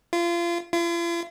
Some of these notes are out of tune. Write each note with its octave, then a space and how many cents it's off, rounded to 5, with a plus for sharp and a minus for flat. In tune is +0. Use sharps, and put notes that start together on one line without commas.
F4 -30
F4 -45